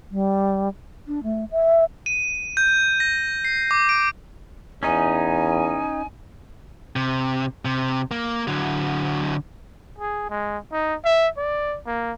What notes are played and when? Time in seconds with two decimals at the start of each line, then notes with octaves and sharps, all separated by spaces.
0.11 G3
1.08 D4
1.23 A3
1.51 E5
2.06 D#7
2.57 G6
3.00 A#6
3.44 C7
3.71 D6
3.89 D7
4.83 E2 C#4 D#4 G#5
6.96 C3
7.65 C3
8.11 A#3
8.47 D3 F#3
9.99 G#4
10.30 G#3
10.72 D#4
11.05 E5
11.37 D5
11.86 A#3